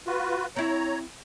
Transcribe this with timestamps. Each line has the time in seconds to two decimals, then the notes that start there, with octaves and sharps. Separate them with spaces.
0.07 F4 F#4 B4
0.56 C4 E4 C#5 A#5